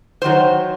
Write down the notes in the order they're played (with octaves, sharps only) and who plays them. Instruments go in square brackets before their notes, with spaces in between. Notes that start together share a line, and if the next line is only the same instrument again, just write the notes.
[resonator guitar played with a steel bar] D#3 F#3 C5